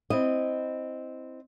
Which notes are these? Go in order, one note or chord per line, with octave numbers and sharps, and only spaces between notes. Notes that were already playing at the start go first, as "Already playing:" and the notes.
C4 E4 D#5